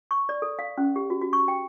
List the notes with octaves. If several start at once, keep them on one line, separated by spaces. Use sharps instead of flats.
C#6
D5
A4
F5
C#4
G4
F#4
F#4
C#6
G5